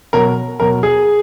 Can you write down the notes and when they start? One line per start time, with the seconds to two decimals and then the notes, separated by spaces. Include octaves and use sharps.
0.13 B2 F#3 A#4
0.60 B2 F#3 A#4
0.83 G#4